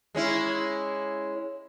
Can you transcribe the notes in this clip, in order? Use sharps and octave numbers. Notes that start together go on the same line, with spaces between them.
G#3 C#4 E4